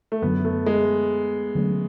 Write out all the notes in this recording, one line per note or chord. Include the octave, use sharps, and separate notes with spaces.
A3
F#2 D3 F#3 B3
A3
G#3
D3 F#3 A3 C#4